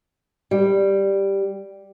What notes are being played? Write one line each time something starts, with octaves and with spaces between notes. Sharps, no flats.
G3